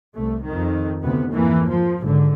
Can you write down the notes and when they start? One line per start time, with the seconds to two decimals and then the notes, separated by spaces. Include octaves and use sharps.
0.15 C2 A3
0.44 F2 D#3
1.02 D2 C3 B3
1.32 F2 G#2 E3 A#3
1.69 F3
2.02 G#1 D3